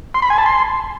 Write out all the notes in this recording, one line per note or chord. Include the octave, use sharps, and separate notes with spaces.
C6
B5
G#5
A5
C6